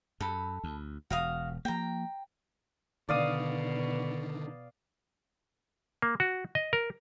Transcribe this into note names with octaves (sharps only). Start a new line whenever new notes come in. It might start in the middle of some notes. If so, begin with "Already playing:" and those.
F#2 A4 B5
D2
E1 F#4 F5 D#6
F3 A#3 G5 A#5
B2 D3 D#3 D5 F5 D#6
A#3
F#4
D#5
A#4